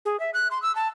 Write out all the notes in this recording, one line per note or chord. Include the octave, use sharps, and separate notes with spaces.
G#4
E5
F#6
C6
E6
A5